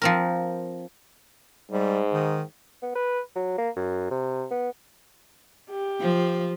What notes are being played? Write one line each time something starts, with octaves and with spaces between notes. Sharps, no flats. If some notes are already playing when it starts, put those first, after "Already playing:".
F3 C4 A#4
G#2 G3
D#3
B3
B4
F#3
A#3
F#2
C3
B3
G4
F3